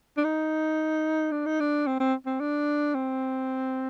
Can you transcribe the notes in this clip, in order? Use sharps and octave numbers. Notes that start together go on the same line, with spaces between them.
D4
D#4
D4
D#4
D4
C4
C4
C4
D4
C4